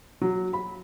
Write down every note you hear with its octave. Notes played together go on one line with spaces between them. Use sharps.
F#3
B5